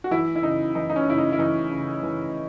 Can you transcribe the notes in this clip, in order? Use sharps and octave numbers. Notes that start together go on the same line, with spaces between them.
F#4
E3 E4
E4
C#3 D#4
E3 D#4
D#4
C#4
C#3 E4
D#4
E4
E3 D#4
C#3
E3